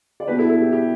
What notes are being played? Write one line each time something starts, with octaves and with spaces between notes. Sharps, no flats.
D5
B2 G3 B3 D4 G4 B4
E4 A4
E4 A4
G4
G4